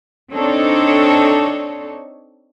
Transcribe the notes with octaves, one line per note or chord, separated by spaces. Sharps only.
C4 D4 D#4 A4 C#5